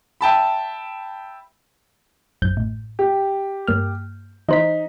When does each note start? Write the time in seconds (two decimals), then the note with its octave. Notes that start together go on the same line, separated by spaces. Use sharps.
0.21 E5 G5 A5 B5
2.42 A1 F#2 G6
2.57 A2
2.99 G4
3.68 G2 A#3 F6
4.49 E3 D#4 C5 B6